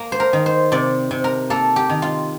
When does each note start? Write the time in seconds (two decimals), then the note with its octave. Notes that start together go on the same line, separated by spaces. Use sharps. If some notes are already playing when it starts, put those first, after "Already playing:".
Already playing: A#3
0.12 C5
0.20 A#4
0.33 D#3
0.46 C5
0.72 C3 D5
1.11 C3
1.24 A#4
1.50 A#3 A4
1.76 G4
1.89 D#3
2.02 F4